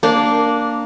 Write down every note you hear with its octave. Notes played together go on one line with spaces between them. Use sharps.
A#3 D4